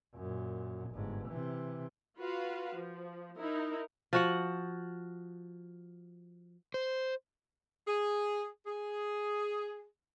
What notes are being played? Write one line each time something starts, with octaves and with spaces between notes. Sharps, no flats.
F#2 A#2
G1 G#2
C3 E3
F4 F#4 B4 F5
F3
D#4 E4 A#4
F3 F#4 F#5
C5
G#4
G#4